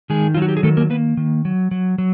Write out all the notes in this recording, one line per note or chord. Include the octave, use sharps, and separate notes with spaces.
D#3 G#3 G#4
F#3 F4
F#4
G4
G#4
D#3 A3 A4
A#3 A#4
A#3 B3 B4
D#3
F#3
F#3
F#3